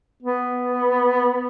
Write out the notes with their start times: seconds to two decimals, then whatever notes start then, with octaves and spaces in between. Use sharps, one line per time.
0.22 B3